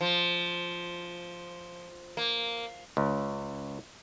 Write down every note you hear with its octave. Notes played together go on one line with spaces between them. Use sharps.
F3
A#3
C#2